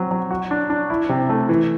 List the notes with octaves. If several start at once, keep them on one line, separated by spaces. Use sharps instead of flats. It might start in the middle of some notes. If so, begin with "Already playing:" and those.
Already playing: F#3 C4
F#3
F#4
D4
D4
E4
C3
A3
E3